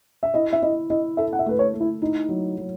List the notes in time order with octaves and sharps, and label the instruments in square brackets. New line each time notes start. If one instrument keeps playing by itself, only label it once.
[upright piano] E5
[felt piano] E4 [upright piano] D#5
[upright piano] E5
[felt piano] E4 [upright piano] D#5
[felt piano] E4 [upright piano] D#5
[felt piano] A4 [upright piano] E5
[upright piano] F#5
E5
[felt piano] A3 [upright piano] B4
[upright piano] C#5
[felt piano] A3
[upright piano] E4
[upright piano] D#4 [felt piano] E4
[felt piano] F#3
F#3